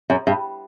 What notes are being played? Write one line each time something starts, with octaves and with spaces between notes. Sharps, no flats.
F#2
G2